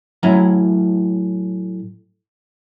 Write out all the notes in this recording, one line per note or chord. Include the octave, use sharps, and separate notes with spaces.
A2 F#3 C#4 E4 A#5